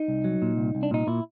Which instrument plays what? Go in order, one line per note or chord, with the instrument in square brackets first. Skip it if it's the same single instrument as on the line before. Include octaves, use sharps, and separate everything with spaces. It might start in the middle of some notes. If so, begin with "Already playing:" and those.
Already playing: [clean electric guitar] D#4
C2
F#3
A#2
C2
C2
D4
A#2 D#4
A#2 E4